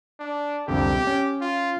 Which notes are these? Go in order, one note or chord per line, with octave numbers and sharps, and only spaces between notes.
D4
C2 F2 D3 G4
C#4
F4